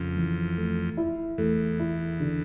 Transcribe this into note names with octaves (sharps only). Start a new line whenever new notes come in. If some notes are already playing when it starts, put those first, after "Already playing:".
Already playing: F2 C#3
E3
A3
E4
E2 A3
E4
D3